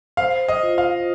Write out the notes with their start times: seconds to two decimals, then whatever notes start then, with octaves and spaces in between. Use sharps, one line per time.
0.17 C5 F5
0.48 D#5
0.63 F4
0.78 F5